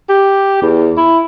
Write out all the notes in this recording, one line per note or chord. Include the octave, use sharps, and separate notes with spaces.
G4
E2
E4